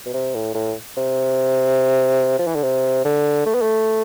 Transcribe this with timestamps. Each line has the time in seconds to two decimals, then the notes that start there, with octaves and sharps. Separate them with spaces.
0.06 B2
0.14 C3
0.35 A2
0.54 A2
0.97 C3
2.39 F3
2.47 E3
2.55 D3
2.63 C3
3.05 D3
3.46 A3
3.54 B3
3.62 A3